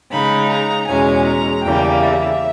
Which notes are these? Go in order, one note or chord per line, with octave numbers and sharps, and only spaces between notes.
C#3 G#3 D#4 B5
A#5
E2 B2 G#3 C#4 G#5
A#5
E2 C#3 G3 A#3 G5
E5